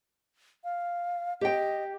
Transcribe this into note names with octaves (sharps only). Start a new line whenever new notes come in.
F5
G4 D#5 G5